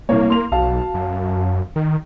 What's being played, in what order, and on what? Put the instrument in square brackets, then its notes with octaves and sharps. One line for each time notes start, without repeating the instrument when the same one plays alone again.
[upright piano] C2 C#5 [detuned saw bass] A#3
[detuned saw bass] A#3 [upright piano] C6 F7
[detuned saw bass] B1 [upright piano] F#4 F5 A5
[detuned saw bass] F#2
D#3